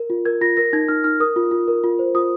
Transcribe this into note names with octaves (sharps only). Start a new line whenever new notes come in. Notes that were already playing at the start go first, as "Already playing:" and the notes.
Already playing: A#4
F4
A#4 G#6
F4 A#6
A#4 A#6
D#4 G#6
D#4 F6
D#4 F6
A#4 D#6
F4
F4
A#4
F4
C5
F4 D#6